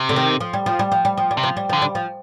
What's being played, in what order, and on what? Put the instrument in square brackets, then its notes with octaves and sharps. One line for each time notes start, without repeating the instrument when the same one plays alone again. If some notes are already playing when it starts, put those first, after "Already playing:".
Already playing: [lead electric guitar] C3
[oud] D3
D#3
F3
G3
F3
G3
F3
G3
F3
G3
[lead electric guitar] C3
[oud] F3
G3
[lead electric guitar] D3 [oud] F3
[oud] G3
F3